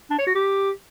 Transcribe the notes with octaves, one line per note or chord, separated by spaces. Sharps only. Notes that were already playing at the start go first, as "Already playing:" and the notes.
D4
C#5
F#4
G4